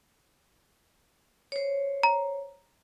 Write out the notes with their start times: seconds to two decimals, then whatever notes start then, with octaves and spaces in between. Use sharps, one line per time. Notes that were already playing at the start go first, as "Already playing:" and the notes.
1.52 C5 C#5
2.03 A#5